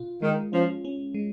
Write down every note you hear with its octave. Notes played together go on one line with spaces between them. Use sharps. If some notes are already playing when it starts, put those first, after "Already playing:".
Already playing: B2 F4
D#3 G#3
F3 C#4
C#4
G#3